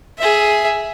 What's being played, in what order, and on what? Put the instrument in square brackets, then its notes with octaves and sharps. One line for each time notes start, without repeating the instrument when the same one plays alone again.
[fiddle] G#4 E5